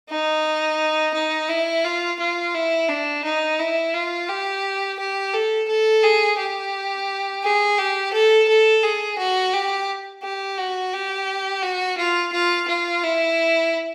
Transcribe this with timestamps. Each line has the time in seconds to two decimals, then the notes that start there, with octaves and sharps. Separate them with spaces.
0.09 D#4
1.14 D#4
1.49 E4
1.84 F4
2.19 F4
2.54 E4
2.89 D4
3.24 D#4
3.59 E4
3.94 F4
4.29 G4
4.99 G4
5.33 A4
5.68 A4
6.03 G#4
6.38 G4
7.43 G#4
7.78 G4
8.13 A4
8.49 A4
8.83 G#4
9.18 F#4
9.53 G4
10.22 G4
10.58 F#4
10.93 G4
11.63 F#4
11.98 F4
12.32 F4
12.68 F4
13.03 E4